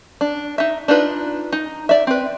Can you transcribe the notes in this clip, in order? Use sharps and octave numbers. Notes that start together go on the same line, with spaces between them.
D4
D#4 E5
D4 D#4 F4 B4
D#4
D5 E5
C4 B4